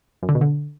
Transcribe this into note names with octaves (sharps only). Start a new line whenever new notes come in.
F#2
D3
B2
D3